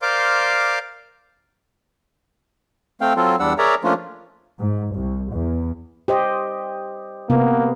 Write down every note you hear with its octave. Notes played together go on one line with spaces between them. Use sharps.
A#4 C5 D5 F5 C6 D6
A3 C4 F5 G5
F#3 C4 F4 A4
E2 G3 D4 F#5 E6
G#4 A#4 C#5 D5 E5 A#5
F3 A3 A#3 C#4 D4 F4
G#2
C2
E2
G4 C5 D#5
C3 A#3 B3